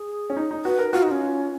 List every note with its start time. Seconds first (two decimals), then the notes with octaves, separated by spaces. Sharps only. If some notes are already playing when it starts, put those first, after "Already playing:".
Already playing: G#4
0.30 C#4
0.37 D#4
0.51 D#4
0.65 F#4 B4
0.79 A#4
0.93 F4 F#4
1.03 D#4
1.07 C#4 F4